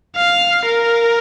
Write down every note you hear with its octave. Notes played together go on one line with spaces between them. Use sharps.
F5
A#4